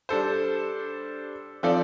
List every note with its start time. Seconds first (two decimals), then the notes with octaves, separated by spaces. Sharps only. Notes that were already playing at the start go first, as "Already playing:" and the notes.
0.09 G3 D4 A4 C5
1.63 F3 C4 F4 A4 D5